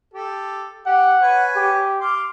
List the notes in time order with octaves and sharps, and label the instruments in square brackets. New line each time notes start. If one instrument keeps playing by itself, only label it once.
[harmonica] G4 A4
[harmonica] G4 [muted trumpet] F#5
[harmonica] B4 C#5 G#5
[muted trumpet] G4
[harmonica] F5 C6 D6